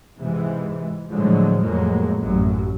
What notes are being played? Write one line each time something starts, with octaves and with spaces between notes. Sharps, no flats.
G#2 C3 E3 G#3
A2 D3 F3 F#3 G#3
F2 A2 F#3 G#3 A#3
A1 F#2 F#3